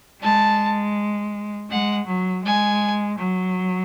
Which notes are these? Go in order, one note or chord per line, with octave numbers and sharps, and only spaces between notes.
G#3 A5
G#3 F#5
F#3
G#3 G#5
F#3